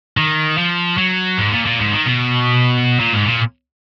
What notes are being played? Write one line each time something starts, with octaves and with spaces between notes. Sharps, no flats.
D#3
F3
F#3
G#2
A#2
A#2
G#2
D#3
B2
A#2
G#2
A#2